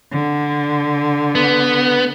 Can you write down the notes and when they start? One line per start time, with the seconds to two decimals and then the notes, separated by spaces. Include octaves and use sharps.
0.11 D3
1.35 B3